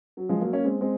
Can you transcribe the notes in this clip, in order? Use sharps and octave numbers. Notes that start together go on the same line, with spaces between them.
F#3
F3 G#3
F#3 A#3
A#3 C#4
G#3 C4
G#3 C4